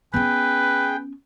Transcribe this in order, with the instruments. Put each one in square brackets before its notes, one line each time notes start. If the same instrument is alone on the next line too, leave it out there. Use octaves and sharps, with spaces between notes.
[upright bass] B3 C#4 [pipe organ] G#4 G5 [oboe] B4